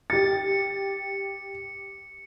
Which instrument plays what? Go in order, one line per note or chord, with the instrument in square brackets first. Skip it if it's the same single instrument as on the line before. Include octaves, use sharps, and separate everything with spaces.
[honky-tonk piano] G4 A6 [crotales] C#7